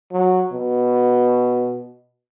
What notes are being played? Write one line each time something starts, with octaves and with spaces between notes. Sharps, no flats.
F#3
B2